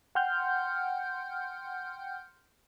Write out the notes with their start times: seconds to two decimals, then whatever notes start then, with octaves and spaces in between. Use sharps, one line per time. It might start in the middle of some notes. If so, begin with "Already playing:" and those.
0.15 F#5 G5 C6 F6 G6